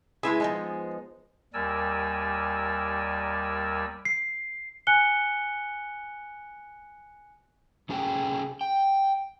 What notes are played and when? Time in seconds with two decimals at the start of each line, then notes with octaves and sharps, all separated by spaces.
0.23 G#3 E4 G#4 B4 E5
0.40 F3 G#3 B3 D#4
1.54 D#2 G3 A#4 D5 G#5 E6
4.05 C7
4.87 G#5 F#6 C#7 G7
7.89 C3 C#4 G#4 A4 D5 G5
8.61 G5